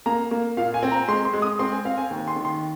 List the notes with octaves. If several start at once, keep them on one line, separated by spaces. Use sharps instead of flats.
A#3 A#5
A#3
A#2 F5
G#5
C4
A#5
G#3 C6
C6
G#3
D#6
C4 C6
G#5
C4 F5
G#5
D#2
C6
D#3
C6